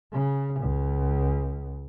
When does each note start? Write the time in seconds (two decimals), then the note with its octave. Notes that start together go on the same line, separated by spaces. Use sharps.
0.12 C#3
0.61 C#2